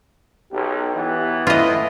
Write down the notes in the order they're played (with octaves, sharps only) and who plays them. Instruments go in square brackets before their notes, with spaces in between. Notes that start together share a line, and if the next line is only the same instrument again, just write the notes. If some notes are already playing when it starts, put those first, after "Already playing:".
[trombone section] B1 [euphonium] G4
[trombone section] E3 F#3 B3
[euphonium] A2 [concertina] E4 B4 [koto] F4 D#5